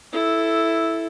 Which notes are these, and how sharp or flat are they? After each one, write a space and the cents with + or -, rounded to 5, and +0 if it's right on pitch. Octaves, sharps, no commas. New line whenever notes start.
E4 +0 A4 -5